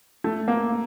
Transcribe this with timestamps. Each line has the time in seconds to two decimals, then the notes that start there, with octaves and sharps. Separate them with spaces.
0.24 A3
0.48 A#3